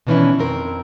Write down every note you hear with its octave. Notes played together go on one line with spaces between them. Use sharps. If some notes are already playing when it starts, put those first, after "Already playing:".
B2 D#3 E3 C#4 D4 E4
F2 C4 A#4